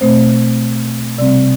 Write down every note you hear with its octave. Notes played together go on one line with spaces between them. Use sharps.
B2 A3 C4 C5
C3 G3 C4 D5